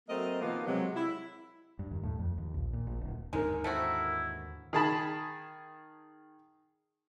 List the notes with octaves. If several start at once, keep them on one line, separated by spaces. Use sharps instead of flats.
F#3 A3 A#3 C4 A#4 D#5
C3 D#3 F3 A#3 B3 D#4
C3 F#3 G#3
E4
G2
D#2
A2
F2
D#2
A#1
A#2
A#1
D1
D#2 G#2 D3 G#3 D#4 A#4
A3 C4 E4 F#4
D#3 G#4 A5 B5